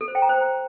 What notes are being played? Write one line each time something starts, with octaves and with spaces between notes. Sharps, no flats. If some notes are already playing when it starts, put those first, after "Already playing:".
A4
C5
G5
A#5
C5